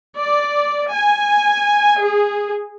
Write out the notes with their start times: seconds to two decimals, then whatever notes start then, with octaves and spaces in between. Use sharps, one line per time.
0.17 D5
0.92 G#5
2.02 G#4